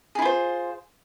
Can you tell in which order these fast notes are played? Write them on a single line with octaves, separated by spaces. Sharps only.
G#4 E4 F4 C5